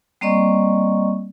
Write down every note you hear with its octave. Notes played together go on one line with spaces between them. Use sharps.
G3 A#3 C4 D5 D#5 C#6